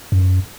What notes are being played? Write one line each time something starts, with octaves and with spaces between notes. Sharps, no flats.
F#2